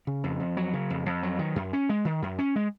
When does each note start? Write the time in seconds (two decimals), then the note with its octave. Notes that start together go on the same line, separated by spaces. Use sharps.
0.07 C#3
0.24 F2
0.40 F2
0.57 F#3
0.73 C#3
0.90 F2
1.06 F2
1.23 F#3
1.39 D#3
1.56 F#2
1.73 C#4
1.89 G#3
2.05 D#3
2.22 F#2
2.39 C#4
2.56 G#3